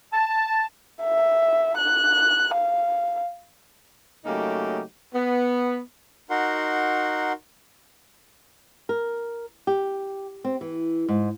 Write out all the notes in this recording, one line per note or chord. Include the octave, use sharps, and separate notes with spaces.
A5
E5
F#6
F5
C#3 F#3 A3 A#3 D#4 G4
B3
D#4 F#4 A#4 F#5 C6
A#4
G4
C4
E3
G#2